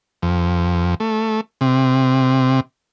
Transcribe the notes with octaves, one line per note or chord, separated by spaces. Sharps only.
F2
A3
C3